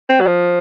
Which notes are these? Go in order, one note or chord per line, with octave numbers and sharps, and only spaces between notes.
C4
F#3
F3